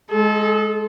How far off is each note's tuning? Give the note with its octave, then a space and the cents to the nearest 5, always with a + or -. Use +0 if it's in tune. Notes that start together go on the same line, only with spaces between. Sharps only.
G#3 +15 A4 -25